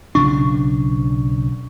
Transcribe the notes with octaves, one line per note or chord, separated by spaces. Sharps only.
B1 C#3 D4 C#6